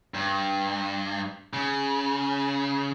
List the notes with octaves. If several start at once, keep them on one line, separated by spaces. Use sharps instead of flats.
G2
C#3